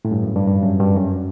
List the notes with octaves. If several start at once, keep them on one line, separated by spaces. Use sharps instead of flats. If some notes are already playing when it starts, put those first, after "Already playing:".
A2
G2
F#2
G2
G2
F#2
G2
F#2